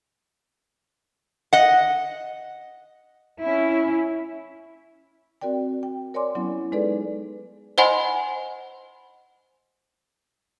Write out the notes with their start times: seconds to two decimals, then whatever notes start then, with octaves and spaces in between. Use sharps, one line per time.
1.53 D#5 F#5
3.41 C#4 E4
5.41 C4 F#4 A#4 D5 G5
5.83 G5
6.14 A#4 C#5 D5 G#5 C6 D6
6.35 F#3 B3 C#4 E4
6.72 G#3 D#4 G#4 A4 B4 D5
7.78 C5 D#5 F#5 G#5 B5 C6